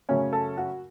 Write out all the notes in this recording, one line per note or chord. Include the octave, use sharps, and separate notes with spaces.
F#2 C#3 F#3 A3 C#4 C#5
A4
F#4